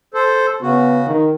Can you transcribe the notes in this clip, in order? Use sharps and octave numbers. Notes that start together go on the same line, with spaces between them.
A4 C5
C#3 B3 F#4
D#3